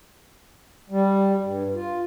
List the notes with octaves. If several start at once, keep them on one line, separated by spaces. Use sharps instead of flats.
G3
G2
F4